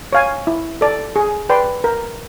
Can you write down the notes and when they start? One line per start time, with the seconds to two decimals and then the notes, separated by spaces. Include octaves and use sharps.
0.13 C#5 F5 G#5
0.47 E4
0.81 A4 D5
1.16 G#4
1.49 B4 D5 G5 C6
1.84 A#4